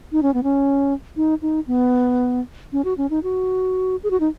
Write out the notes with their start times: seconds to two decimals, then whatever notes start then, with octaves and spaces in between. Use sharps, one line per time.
0.12 D#4
0.23 C#4
0.34 B3
0.43 C#4
1.17 D#4
1.42 D#4
1.67 B3
2.73 C#4
2.85 F#4
2.98 C#4
3.10 D#4
3.23 F#4
4.03 G#4
4.11 F#4
4.20 D#4